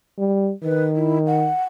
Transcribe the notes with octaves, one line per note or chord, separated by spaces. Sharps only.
G3
D#3 B4
E4
F#5